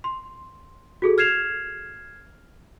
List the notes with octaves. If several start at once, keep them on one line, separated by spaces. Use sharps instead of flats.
C6
F#4 G#4 A4
F6 G#6 C7 E7 F7